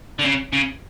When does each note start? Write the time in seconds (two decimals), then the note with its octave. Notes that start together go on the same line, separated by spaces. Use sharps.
0.19 D3
0.24 C#3
0.53 C#3